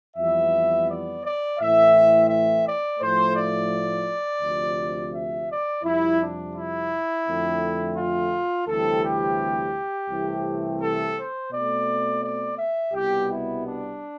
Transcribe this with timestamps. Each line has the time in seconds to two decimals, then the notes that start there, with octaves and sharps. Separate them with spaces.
0.17 F2 E3 G3 B3 E5
0.88 D5
1.23 D5
1.58 A2 E3 A3 C4 E5
2.30 E5
2.65 D5
3.00 A2 F3 A3 C5
3.36 D5
4.42 D2 C3 F3
5.13 E5
5.49 D5
5.84 F2 C3 G3 E4
6.20 D4
6.55 E4
7.26 F2 D3 A3 C4
7.97 F4
8.67 D2 C3 E3 G3 C4 A4
9.03 G4
10.10 C2 C3 E3 A3 C4
10.81 A4
11.16 C5
11.51 B2 A3 C4 D5
12.22 D5
12.58 E5
12.93 C2 B2 G3 B3 G4
13.28 E4
13.65 D4